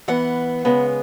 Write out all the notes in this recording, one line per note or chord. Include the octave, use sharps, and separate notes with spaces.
E3 B3 F#5
C#3 G#3 B3